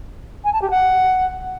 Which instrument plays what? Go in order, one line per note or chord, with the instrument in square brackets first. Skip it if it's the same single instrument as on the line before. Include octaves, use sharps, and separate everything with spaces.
[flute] G#5
A5
G4
F#5